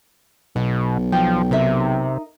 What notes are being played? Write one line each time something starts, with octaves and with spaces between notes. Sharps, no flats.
B1 B2 F#5
F3 G5
C3 D#4 A#4 E5